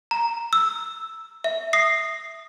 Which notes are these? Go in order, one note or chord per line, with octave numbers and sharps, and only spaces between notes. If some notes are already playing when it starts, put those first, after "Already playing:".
A#5
E6
E5
D#6 A#6 C7